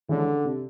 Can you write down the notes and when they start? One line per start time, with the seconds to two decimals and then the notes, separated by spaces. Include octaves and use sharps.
0.09 D3 E3 G#3 C#4
0.45 C3